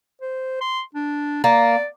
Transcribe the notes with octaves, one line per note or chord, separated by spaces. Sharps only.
C5
C6
D4
A#3 D5